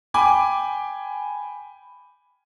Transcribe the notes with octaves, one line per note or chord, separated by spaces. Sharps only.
G5 G#5 B5 D6